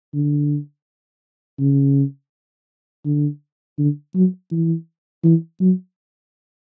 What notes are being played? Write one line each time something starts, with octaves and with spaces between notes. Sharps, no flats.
D3
C#3
D3
D3
F#3
E3
E3
F#3